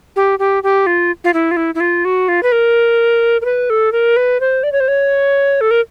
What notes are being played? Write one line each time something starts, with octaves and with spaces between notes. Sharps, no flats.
G4
G4
G4
F4
F4
E4
F4
E4
E4
F4
F#4
F4
B4
A#4
A#4
B4
A4
A#4
B4
C5
D5
C#5
C5
C#5
A4
A#4